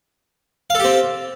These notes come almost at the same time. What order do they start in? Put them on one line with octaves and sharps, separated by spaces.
F5 A4 G4 C4